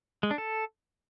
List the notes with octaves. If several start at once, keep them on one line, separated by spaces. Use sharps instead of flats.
G#3
D4
A4